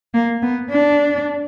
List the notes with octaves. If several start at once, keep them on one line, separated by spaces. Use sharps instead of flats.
A#3
B3
D4